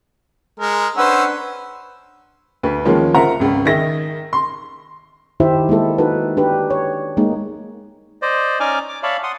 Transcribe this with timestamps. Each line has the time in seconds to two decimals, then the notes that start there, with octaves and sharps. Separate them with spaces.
0.60 G#3 A#4
0.96 C#4 D4 B4 C5 F#5 E6
2.63 D2 B4
2.85 D#3 F3 G#3 A#3 C#4 F4
3.14 F4 A#4 C5 E5 F#5 A#5
3.40 G#1 C#2
3.65 D#3 D#4 G#4 E5 A#6
4.33 C6
5.40 D#3 D#4 E4 G4 C5 E5
5.69 G#3 A#3 E4 A4
5.98 D#4 F#4 A4 B4
6.37 D4 G4 B4
6.70 C#5
7.17 G#3 A#3 D#4
8.22 C5 D5 D#5
8.60 C#4 D#4 D5 G#5 D6 F6
8.89 D6
9.03 C#5 D5 E5 F5 A5 B5
9.23 F#5 C6 D#6